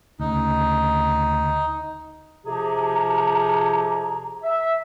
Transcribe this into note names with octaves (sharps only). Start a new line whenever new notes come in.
D2 C#3 D#4
F2 C3 F3 G4 G#4 A#5
E5